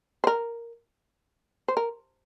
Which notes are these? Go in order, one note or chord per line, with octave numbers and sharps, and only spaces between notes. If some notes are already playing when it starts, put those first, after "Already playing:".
C5
A#4
C5
A#4